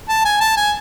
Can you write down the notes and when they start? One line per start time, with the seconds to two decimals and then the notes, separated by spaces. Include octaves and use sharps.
0.09 A5
0.25 G#5
0.41 A5
0.57 G#5